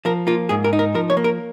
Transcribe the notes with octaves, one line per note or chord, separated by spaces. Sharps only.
F3 A#4
A#3 F4
G#2 G#4
A#4
D#4
A#4
F3 A#4
C#5
A#3
A#4